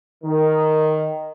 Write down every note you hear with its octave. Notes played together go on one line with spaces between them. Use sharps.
D#3